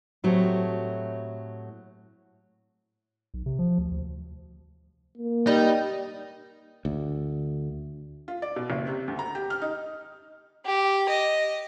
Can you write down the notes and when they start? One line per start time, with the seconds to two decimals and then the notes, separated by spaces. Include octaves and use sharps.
0.24 A2 F#3 A3 C4 G4
3.34 B1
3.46 C3
3.59 F3
3.78 D2
3.92 D2
5.18 A#3
5.47 G3 D#4
6.85 D2
8.28 F4
8.42 D5
8.56 B2
8.70 F#1
8.87 C3
9.08 D2
9.19 A#5
9.35 G4
9.50 F6
9.62 D#4
10.66 G4
11.09 D#5